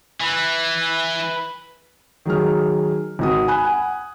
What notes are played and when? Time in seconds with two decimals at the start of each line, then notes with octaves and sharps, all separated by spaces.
0.21 E3 B4
2.26 D#3 F#3 G#4 F6
3.19 G#1 F#4 D#6
3.48 G#5 B5 F#6
3.65 F#5 G#5